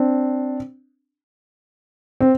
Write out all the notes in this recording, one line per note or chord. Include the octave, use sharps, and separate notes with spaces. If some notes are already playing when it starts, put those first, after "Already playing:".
Already playing: C4 D4
C4